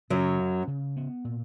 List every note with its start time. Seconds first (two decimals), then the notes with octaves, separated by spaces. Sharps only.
0.10 F#2 C#3 F#3
0.39 C#4
0.67 C#3
0.97 B3
1.25 A#2